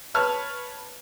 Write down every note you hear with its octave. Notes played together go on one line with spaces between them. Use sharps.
B4 C#5 A5 F6